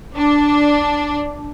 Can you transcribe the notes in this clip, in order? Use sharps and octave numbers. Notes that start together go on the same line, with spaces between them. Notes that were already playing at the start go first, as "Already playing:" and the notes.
D4